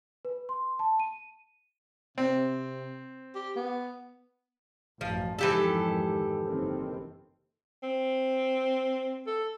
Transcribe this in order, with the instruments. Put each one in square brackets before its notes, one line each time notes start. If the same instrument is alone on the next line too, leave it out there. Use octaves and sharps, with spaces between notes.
[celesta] B4
C6
A5
D#7
[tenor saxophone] C3 [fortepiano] C4
[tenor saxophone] G4
B3
[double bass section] A1 F#2 [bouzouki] F3
[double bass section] F2 G#2 D#3 [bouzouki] E3 G4 A4
[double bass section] F#1 D#3 C4
[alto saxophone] C4
A4